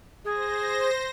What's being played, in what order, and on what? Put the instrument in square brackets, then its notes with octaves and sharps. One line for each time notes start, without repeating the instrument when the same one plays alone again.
[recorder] G#4 [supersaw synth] C5 A#6